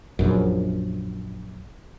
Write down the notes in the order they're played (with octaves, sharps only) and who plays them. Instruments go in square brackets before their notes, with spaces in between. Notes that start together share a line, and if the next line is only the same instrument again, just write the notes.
[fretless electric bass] A#1 F#2